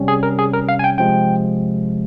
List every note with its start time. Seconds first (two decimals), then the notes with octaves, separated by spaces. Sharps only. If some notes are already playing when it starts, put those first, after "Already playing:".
Already playing: C3 G3 C#4
0.08 G#4
0.23 A#4
0.39 G#4
0.54 A#4
0.69 F5
0.79 G#5
0.84 G5
0.98 C3 F3 G#3 G5